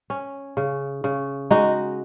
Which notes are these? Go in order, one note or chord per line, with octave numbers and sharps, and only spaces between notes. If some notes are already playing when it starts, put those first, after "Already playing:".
C#4
C#3
C#3
G#3 D#4 F#4